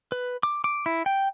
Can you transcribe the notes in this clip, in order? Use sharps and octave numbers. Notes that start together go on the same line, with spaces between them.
B4
D6
D6
E4
G5